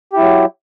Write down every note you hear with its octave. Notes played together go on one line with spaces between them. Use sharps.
F#3 E4 G4